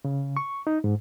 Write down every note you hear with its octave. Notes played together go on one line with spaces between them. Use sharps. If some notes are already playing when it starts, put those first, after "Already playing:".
C#3
C#6
D#4
G#2